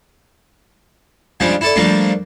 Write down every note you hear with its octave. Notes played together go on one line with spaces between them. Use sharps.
C#3 F3 G3 G#3 D4
E4 A4 D5
F3 G3 A3 A#3 D4